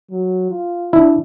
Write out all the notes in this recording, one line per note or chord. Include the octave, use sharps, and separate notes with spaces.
F#3
F4
D4 E4